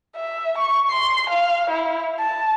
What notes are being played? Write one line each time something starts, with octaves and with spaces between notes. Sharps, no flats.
E5
C#6
C6
F5
E4
A5